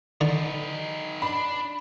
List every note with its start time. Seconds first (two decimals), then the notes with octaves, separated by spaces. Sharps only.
0.21 D3 D#4 B4
1.22 D4 B5